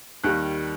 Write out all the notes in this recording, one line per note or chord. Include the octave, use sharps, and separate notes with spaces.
D#2 D#3 G3 F#6